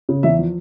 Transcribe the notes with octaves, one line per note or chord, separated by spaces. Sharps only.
C#3
E2 E5
F3